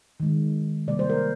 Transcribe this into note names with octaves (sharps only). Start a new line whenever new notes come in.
D#3 G#3
C3 G3 A#3 D5
C5
A#4